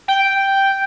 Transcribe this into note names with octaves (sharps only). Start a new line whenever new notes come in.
G5